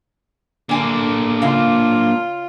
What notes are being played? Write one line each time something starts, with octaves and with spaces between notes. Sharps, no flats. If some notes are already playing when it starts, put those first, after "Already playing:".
D3 A#3 D4 G#5
C#3 F4 F5